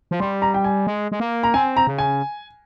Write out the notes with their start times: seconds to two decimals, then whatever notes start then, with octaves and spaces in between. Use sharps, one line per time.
0.11 F3
0.20 G3 C6
0.42 A#5
0.54 G5
0.64 G#5
0.87 G#3
1.12 G#3
1.20 A#3
1.43 A#5
1.54 C4 G#5
1.77 A#5
1.87 C#3
1.98 G#5